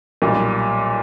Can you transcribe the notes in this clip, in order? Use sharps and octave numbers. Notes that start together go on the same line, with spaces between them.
B1 A#2 G3